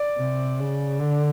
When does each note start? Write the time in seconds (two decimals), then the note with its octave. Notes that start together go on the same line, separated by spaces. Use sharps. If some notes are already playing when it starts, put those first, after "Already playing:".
Already playing: D5
0.18 C3
0.60 C#3
1.00 D3